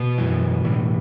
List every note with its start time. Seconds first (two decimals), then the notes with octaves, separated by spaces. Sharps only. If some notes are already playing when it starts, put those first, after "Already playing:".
Already playing: B2 B3
0.18 F#2 E3
0.64 A2 E3